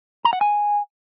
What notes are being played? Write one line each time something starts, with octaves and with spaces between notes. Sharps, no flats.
A#5
F#5
G#5